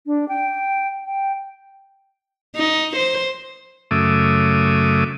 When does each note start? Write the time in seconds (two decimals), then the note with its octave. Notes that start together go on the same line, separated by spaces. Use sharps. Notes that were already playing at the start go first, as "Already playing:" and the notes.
0.06 D4
0.29 G5
1.06 G5
2.56 D#4
2.96 C5
3.91 F#2 C#3 A3 E5 D6 D#6